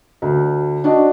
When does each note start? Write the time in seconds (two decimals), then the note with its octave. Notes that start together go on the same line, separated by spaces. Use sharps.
0.22 D2
0.84 D4 F#4 D#5